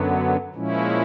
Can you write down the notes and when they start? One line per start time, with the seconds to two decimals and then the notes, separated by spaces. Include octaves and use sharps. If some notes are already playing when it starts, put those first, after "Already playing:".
Already playing: F#2 D3 F#3 B3
0.54 A#2 F3 G#3 C#4 E4